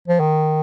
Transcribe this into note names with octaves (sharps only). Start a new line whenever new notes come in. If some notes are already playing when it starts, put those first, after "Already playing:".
F3
D#3